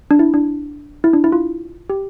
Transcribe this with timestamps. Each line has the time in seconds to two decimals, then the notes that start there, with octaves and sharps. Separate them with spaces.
0.11 D4
0.19 E4
0.34 D4
1.04 E4
1.13 D4
1.24 E4
1.32 F4
1.90 G4